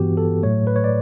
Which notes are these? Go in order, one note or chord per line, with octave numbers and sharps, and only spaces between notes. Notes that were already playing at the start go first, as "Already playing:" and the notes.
Already playing: G2 E3 B3 F#4 G4
A4
A2 F#3 A3 C#5
B4
C#5
D5